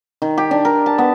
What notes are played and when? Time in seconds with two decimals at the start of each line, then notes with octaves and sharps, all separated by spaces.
0.22 D#3
0.38 G4
0.51 D4
0.65 A#4
0.86 A5
0.98 B3